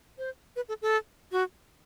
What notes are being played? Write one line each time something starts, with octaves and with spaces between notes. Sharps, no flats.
C5
B4
A4
A4
F#4